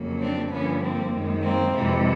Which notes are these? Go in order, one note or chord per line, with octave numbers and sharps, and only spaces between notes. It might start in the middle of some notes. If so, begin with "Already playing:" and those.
Already playing: F2 C#3 F#3 A#3
C4 D4
G2 D3 F3 A#3 B3 C#4
A#3 C4
F#2 D#3 G#3
A#3 C4
F2 C3 E3 G#3